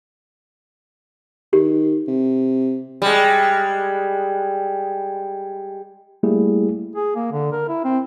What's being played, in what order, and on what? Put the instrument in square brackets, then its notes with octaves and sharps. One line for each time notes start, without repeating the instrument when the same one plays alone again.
[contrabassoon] D#3 [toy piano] G4
[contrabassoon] C3
[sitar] G3 G#3
[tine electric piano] G3 A3 A#3 E4 G4 G#4
[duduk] G#4
A#3
D3
A#4
E4
C4